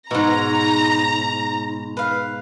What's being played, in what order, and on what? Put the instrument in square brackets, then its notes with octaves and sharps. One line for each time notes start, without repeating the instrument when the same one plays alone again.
[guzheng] G#2 B2 [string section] A#5
[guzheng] B4 F5